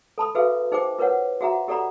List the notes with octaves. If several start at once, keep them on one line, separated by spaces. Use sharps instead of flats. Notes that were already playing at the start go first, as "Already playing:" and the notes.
A4 A5 B5 D#6
F#4 G#4 A4 B4 E5 F5
D#4 G#4 C5 G5 D6
F4 A#4 B4 C#5 F#5
F#4 G#4 E5 F#5 A#5
G4 A4 D5 F#5 A#5 B5